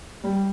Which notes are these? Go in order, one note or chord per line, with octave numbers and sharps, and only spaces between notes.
G3